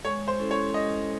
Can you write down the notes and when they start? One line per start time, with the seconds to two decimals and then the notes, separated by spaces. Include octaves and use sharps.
0.05 G#3 C#5
0.28 C5
0.39 C#4 E4 A4
0.51 C#5
0.74 G#3 D#5